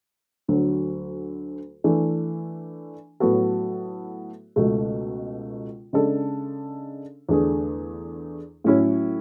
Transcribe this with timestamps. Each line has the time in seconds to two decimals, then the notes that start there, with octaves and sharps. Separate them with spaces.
0.48 D2 D3 F#3
1.84 E3 A3 D4
3.20 A2 F#3 B3 F#4 A4
4.56 C#2 B2 A3
5.93 C#3 G#3 D4 A4
7.29 E2 D3 A3 D4 G#4
8.64 A2 F#3 C#4 E4